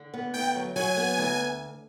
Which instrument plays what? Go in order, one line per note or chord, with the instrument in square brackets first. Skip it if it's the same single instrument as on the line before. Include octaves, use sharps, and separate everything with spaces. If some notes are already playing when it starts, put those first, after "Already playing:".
Already playing: [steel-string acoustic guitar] D3
B3
[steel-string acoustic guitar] D2 [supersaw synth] G5
[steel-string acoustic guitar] F#3
[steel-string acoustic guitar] F#3 [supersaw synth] G#5
[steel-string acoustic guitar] B3
D2